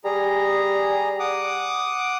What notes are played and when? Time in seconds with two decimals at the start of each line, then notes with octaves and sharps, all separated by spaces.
0.04 G3 G#4 A#5
1.20 F#5 D6 D#6